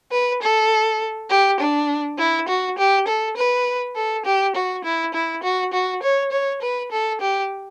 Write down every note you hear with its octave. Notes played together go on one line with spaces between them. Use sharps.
B4
A4
G4
D4
E4
F#4
G4
A4
B4
A4
G4
F#4
E4
E4
F#4
F#4
C#5
C#5
B4
A4
G4